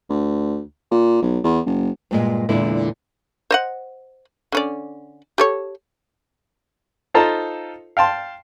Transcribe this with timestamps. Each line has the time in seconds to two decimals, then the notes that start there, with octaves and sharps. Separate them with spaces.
0.10 D2
0.91 A#2
1.22 B1
1.44 E2
1.66 F#1
2.11 G2 A#2 G#3
2.49 E2 A#2 D3 G#3 E4
3.51 C5 D#5 F#5
4.52 D3 C#4 D5
5.38 G4 A4 C#5
7.14 D#4 F4 A4 C5 A5 A#5
7.97 F5 G5 A5 C6